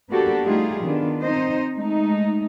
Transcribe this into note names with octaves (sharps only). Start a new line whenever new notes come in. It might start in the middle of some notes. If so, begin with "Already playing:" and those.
A#3 B3 D4 F#4 G4 A4
G3 A3 D#4 F4 G4 G#4
D#3 B3 D4 F4
C4 D#4 C5 D#5
G#3 A3 D#4